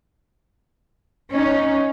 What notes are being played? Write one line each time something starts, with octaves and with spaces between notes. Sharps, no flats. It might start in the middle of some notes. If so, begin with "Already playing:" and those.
C#4 D#4